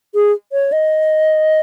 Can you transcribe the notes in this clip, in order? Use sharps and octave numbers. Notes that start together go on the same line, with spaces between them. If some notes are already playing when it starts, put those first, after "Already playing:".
G#4
C#5
D#5